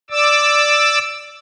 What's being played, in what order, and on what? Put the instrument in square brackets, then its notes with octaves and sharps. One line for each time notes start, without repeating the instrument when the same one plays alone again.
[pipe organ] D5 D6 E6